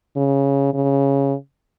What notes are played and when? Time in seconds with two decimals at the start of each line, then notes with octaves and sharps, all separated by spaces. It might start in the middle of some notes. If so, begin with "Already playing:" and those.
0.17 C#3
0.74 C#3